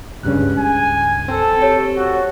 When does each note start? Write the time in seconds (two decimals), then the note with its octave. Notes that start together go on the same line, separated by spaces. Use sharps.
0.23 C#2 G2 C#3 F#6
0.58 G#5
1.28 C4 A4
1.62 G4 C#5
1.97 F#4